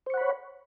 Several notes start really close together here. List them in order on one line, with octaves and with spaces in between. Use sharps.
C5 C#6 F#5 B5 C#5